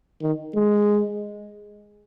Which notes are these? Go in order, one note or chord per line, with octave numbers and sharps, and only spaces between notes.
D#3
G#3